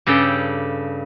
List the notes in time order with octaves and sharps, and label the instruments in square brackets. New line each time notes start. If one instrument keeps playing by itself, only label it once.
[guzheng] G2 C#3 G4 A4 G5